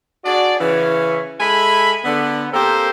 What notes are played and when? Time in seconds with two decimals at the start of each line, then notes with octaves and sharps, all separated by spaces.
0.25 D4 F#4 G#4 D5
0.60 C#3 E3 C#4
1.39 G#3 A4 E5 G#5 B5
2.04 D3 B3
2.52 A#3 C4 G4 A4 A#4 C5